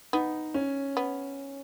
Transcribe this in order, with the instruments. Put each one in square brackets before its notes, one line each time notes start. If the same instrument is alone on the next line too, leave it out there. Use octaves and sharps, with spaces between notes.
[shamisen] B3 [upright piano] D#4
[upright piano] C#4
[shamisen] B3